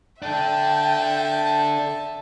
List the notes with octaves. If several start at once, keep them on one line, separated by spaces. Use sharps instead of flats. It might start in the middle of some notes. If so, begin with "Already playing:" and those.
D4 A4 E5 G5 A5